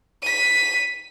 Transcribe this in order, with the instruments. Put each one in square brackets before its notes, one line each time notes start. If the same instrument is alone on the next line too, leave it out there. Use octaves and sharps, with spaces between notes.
[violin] B6 D#7